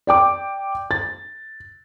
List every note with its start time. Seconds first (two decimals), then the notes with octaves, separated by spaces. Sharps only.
0.07 D5 G5 D6
0.91 A6